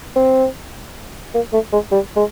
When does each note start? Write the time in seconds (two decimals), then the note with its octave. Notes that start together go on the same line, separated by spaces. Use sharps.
0.16 C4
1.34 A#3
1.53 A3
1.73 G#3
1.92 G3
2.16 G#3